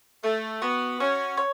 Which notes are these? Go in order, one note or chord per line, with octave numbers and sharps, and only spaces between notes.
A3 A4
B3 F#4
C#4 F#4
C#5